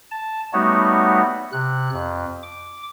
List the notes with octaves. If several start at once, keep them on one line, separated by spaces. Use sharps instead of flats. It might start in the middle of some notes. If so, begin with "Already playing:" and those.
A5
G3 A3 B3 D#4 F#4 C#5
C3 F#6
F2
D6